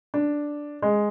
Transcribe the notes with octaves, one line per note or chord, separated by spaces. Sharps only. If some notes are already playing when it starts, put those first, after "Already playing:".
D4
G#3